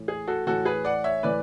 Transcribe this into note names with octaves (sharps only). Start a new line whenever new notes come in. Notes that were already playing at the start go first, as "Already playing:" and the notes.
Already playing: A2 E3
G#4
F#4 A4
A2 E3 F#4 A4
G#4 B4
D5 F#5
C#5 E5
A2 E3 B4 D5